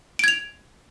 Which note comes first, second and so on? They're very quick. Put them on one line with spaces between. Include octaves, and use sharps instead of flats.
D7 G#6 F7